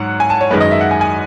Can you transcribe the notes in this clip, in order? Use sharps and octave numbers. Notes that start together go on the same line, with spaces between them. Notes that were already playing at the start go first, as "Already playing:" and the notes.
Already playing: G#2 F#3 F#5
G#5
A5
C#5
F#2 D#3 G#3 B4
D#5
E5
F#5
G#5
G#5